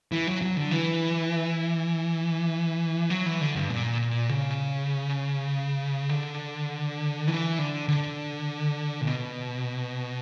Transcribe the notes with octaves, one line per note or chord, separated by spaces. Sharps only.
E3
F#3
F#3
D3
E3
F#3
E3
D3
G2
A#2
C#3
D3
E3
D3
D3
A#2
B2